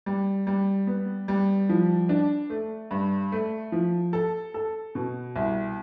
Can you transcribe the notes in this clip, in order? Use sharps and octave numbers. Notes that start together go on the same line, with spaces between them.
G3
G3
B3
G3
F3
D4
A3
G2
A3
F3
A4
A4
B2
C2